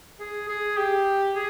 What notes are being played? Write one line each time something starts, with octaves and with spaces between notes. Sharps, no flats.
G#4
G#4
G4
G#4